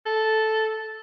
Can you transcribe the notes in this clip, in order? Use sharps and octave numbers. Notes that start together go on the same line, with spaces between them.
A4